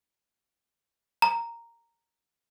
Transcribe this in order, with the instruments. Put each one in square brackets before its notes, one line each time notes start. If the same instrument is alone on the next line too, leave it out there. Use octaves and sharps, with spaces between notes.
[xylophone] A#5